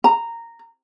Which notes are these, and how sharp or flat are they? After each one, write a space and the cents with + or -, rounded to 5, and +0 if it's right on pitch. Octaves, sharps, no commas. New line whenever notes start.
A#5 -10